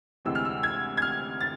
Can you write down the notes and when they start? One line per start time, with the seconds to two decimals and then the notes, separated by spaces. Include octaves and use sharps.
0.25 D2 C3 E3 G#3 C4 E6
0.35 F6
0.45 E6
0.63 G#6
0.97 G#6
1.02 F6
1.41 A6